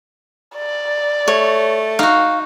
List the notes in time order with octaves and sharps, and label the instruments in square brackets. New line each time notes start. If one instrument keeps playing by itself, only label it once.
[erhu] D5
[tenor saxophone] A3 [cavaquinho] C#5
[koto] D#4 F#4 [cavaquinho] F5